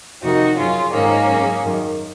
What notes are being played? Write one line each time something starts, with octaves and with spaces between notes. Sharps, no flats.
F2 C3 D#3 D#4 F#4
F#2 C#3 C#4 F4
G#2 D#3 A#3 C#4
F#2 C#3
F#2 D#3